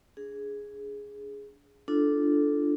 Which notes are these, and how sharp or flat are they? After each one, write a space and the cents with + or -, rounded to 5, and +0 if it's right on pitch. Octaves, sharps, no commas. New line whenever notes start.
D4 -30 G#4 +0
D4 +0 F4 -25 A4 -10